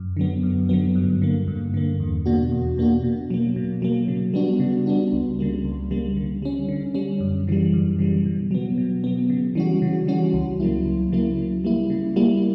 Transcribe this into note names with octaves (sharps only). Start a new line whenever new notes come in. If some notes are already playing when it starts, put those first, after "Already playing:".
Already playing: F#2
D3 F#3 B3
F#2
D3 F#3 B3
G2
D3 A#3
G2
D3 A#3
E2
B2 A#3 D4 F#4
E2
B2 A#3 D4 F#4
B2
F#3 A#3
B2
F#3 A#3
C#3
G3 B3 D4 F#4
C#3
G3 B3 D4 F#4
C#2
C#3 G3 A#3
C#2
C#3 G3 A#3
D3
G3 C#4
D3
G3 C#4
F#2
C#3 E3 G3
F#2
C#3 E3 G3
B2
F#3 B3
B2
F#3 B3
C#3
E3 G3 C#4 F#4
C#3
E3 G3 C#4 F#4
C#2
C#3 F#3 A#3 E4
C#2
C#3 F#3 A#3 E4
C#3
G3 A#3 E4
C#3
G3 A#3 E4